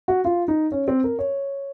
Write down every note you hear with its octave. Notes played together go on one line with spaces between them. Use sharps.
F#4
F4
D#4
C#4
C4
A#4
C#5